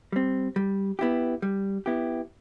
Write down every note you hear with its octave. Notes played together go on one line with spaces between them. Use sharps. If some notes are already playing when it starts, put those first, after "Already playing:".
G3 C4
G3
B3 E4 G4
G3
B3 E4 G4